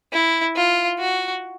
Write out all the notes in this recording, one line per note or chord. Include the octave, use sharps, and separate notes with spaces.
E4
F4
F#4